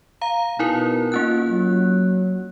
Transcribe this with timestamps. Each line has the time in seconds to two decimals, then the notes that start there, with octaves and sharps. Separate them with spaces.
0.21 F5 A#5
0.59 B2 D#4 E4 A#4
1.12 A#3 C#4 F4 F#6
1.51 F#3